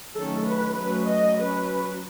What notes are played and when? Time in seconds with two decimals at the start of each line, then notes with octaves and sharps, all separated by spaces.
0.15 D#3 F#3 A3 C#4 A4
0.46 B4
0.77 F#3 A3 C#4 B4
1.08 D#5
1.38 F#3 C#4 B4